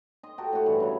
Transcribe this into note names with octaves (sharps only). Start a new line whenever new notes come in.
D#5 C6
F#4 G4 A4 A#4
A2 F#4
G2 E3
C#3 F#3